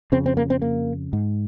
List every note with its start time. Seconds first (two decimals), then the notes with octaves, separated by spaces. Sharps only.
0.12 F2 C#3 C4
0.26 C4
0.37 A#3
0.50 C4
0.62 A#3
1.13 G#2